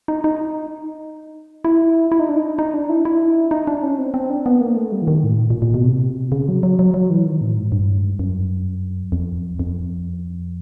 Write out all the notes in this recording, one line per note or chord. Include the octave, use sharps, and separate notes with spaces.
D#4
D#4
E4
E4
D#4
D4
D#4
D#4
D4
E4
E4
D#4
D4
C#4
C4
C4
D4
B3
A#3
A3
G3
E3
D#3
A2
A#2
A#2
A#2
B2
C3
C#3
F#3
F#3
F#3
F#3
E3
D#3
A2
G#2
G2
F#2
F2
F2